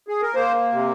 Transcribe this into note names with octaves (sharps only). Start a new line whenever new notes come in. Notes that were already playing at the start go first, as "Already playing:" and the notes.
G#4
A#4
A#3 C5
C3